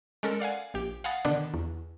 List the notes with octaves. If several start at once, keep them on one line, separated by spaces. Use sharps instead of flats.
G#3 C#4 A4 A#4
D5 F5 F#5 G#5
A#1 G4
F5 F#5 G#5 B5 D#6 A6
B2 D3 D#3 B3 D4
E2